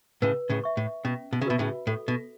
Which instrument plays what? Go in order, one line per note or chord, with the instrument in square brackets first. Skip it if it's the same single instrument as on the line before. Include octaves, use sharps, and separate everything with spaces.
[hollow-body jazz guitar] A2 C#3 [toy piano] B4
[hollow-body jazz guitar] A2 C#3
[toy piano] E5 C#6
[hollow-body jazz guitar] A2
[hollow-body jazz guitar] B2 [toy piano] C#4
[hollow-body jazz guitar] B2
C#3
[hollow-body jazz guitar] B2 [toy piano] F#4 B4 E5 B5
[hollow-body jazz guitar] A2 C#3
[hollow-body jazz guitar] A2 [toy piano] A4
[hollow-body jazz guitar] B2